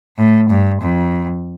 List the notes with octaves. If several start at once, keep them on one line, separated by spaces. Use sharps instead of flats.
A2
G2
F2